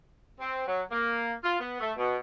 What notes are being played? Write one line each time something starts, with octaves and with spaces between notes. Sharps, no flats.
C4
F#3
A#3
F4
B3
A3
B2